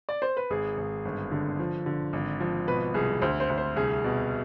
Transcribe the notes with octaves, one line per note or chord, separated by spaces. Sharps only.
D5
C5
B4
G#1 G#4
G#1
G1
D3
F3
D3
G#1
F3
B2 B4
C2 G#4
D2 C5
C5
D2
C5
C2 G#4
B2